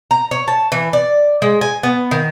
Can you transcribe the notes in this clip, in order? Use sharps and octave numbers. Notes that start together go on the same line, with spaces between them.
A#5
C#5
A5
E3
D5
G#3
G#5
B3
D#3